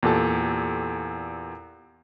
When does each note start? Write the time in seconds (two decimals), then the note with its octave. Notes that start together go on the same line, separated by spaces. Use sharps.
0.03 E2 A#2 G4 A4 A5